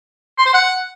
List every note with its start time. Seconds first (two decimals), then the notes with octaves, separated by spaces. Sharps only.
0.38 C6
0.46 C5
0.54 F#5